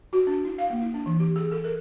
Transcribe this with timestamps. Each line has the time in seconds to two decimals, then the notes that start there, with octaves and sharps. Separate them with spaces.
0.13 F#4
0.27 D4
0.45 E4
0.58 F5
0.70 A#3
0.81 E4
0.94 D4
1.06 E3
1.20 G4
1.36 G#4
1.51 A4
1.64 A#4